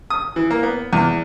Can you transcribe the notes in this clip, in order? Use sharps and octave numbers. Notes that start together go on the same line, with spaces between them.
D#6
E3
A#3
B3
E2